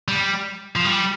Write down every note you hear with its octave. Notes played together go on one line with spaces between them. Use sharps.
G3
F3
G3